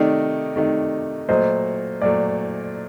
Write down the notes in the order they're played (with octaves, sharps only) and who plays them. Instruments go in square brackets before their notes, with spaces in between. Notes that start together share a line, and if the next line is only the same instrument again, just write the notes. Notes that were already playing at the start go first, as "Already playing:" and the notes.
Already playing: [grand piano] C3 D#3 A3 D#4 [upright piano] D5
[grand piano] C3 D#3 A3 D#4
[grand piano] A#2 F#3 A3 [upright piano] C5 D#5
[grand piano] A#2 F#3 A3 [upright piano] D5